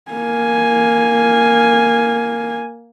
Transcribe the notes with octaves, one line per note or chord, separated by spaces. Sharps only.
A#3 G#5